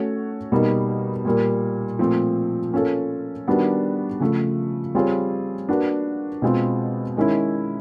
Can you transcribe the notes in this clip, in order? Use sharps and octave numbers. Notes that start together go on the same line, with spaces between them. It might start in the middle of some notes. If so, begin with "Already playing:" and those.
Already playing: A3 C#4 F#4 A4 C#5
B2 G3 A#3 D#4
A#2 G3 A#3
A#2 F3 A3 C4
A#3 C#4 F4 A4
D#3 G3 B3 D4 F#4
C#3 F3 A3
G3 C4 F4 G#4 C#5
A#3 D4 F#4 B4
B2 G#3 C4 F4
D#3 G#3 C#4 E4